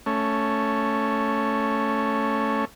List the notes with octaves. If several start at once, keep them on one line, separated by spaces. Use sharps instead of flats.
A3 C#4